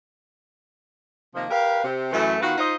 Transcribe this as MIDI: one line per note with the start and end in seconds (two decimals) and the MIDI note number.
1.35 1.46 48
1.35 1.46 51
1.35 1.46 53
1.35 1.46 58
1.51 1.84 67
1.51 1.84 70
1.51 1.84 71
1.51 1.84 77
1.84 2.11 48
2.13 2.36 42
2.13 2.36 52
2.13 2.36 57
2.41 2.56 51
2.41 2.56 59
2.41 2.56 65
2.41 2.56 66
2.58 2.74 63
2.58 2.74 65
2.58 2.74 72
2.58 2.74 75